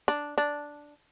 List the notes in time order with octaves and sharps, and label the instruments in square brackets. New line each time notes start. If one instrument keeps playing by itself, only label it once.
[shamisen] D4
D4